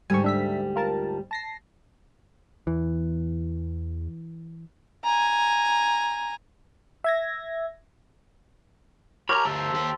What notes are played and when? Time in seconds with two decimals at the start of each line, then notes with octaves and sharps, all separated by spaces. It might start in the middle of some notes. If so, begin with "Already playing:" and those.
0.10 D2 G#2 G3 G#5 C#6
0.24 D4 E5 B6
0.76 F4 A#4 A5
1.31 A5 A#6 C7
2.67 E2 E3
5.04 G#5 A#5
7.04 E5 G#6 A#6
9.29 G4 A#4 C#5 A#5 B5
9.45 D2 G4 A4 C5
9.72 D#2 G4